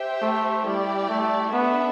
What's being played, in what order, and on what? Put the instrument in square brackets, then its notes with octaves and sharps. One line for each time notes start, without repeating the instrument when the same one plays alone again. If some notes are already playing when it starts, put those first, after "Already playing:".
Already playing: [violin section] G4 C5 E5 G5
[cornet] A3
[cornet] G3 [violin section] E4 G4 D5
[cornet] A3
[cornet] B3 [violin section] D4 A4 E5